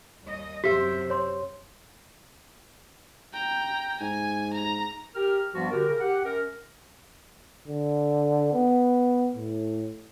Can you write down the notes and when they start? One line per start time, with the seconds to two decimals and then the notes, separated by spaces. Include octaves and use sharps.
0.22 D#2 G3 D#5
0.64 F#2 C3 G4 C5 E5 B6
1.10 C#5 C6
3.33 G5 A#5
4.01 G#2 G#5
4.54 A#5
5.15 G4 A#4 F6
5.55 G2 F3 G3 B3 D4 F#4
5.71 D3 F#4 G4 A#4
5.87 C#3 A#4
6.00 G4 F#5
6.24 F#2 A#4
7.68 D3
8.53 B3
9.36 A2